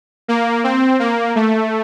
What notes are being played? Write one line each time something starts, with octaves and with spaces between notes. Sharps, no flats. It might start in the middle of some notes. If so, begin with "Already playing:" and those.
A#3
C4
A#3
A3